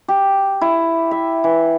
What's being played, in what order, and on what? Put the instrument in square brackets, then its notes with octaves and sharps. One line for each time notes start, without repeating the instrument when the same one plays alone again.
[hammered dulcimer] G4
E4
E5
E3